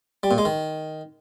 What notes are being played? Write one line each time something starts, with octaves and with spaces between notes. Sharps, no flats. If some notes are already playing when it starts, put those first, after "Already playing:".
G3
A#2
G#3
D#3